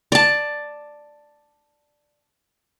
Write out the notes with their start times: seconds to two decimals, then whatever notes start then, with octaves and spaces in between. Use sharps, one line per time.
0.12 D5 A5